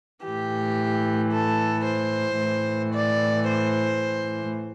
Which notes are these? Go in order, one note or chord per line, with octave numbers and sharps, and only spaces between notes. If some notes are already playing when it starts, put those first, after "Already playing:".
A2 E3 G4
A4
C5
A2 E3
D5
C5